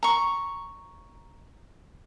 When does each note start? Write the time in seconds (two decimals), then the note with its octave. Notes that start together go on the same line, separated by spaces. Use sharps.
0.03 A#5 C#6